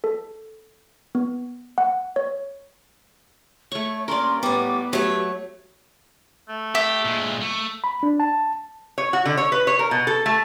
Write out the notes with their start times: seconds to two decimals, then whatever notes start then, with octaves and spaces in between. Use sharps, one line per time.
0.04 A4
1.15 B3
1.78 F#5
2.16 C#5
3.72 A3 C#5 C#6
4.08 G2 A#3 C#4 A#4 D5 C6
4.43 A2 G3 B3 D6
4.93 F#3 A3 G4 C#5
6.49 A3
6.75 G4 E5
7.05 A#2 G#3
7.42 A3
7.84 B5
8.03 D4
8.20 A5
8.98 C#5
9.13 F#4
9.26 D3
9.37 C#5
9.52 B4
9.67 C#5
9.79 A#4
9.91 B2
10.07 A4
10.26 A3